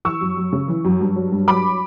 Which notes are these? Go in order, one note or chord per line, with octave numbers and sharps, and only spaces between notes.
E3 C#6 E6
F#2
F#2
C#3
E3
F#2
G2
F#3
G2
F#3 B5 D6